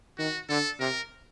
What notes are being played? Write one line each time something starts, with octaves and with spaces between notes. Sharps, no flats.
D#3 F#4
D3 A4
C3 A#4